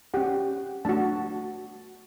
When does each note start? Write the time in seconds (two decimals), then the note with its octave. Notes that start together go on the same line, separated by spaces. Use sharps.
0.14 C#4 G4 F#5
0.85 A3 D4 F#4 A5